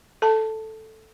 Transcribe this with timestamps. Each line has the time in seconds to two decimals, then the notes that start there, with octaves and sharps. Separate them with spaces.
0.22 A4 A5